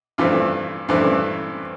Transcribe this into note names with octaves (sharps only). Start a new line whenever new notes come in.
G2 E3 A3 C4 F4
G2 E3 A3 C4